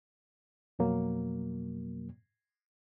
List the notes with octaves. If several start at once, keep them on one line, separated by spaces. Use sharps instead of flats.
F2 B2 F#3 A#3